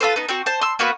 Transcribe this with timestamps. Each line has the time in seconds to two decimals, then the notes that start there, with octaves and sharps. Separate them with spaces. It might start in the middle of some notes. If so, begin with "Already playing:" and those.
0.01 F4 A4 B4 C5
0.16 B3 D#4
0.29 C4 F#4
0.46 C5 A5
0.61 C6 E6
0.79 A#3 B3 F#4 B4